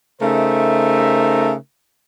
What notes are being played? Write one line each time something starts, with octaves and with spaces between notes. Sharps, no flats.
C#3 A3 D#4 A#4 C5 E5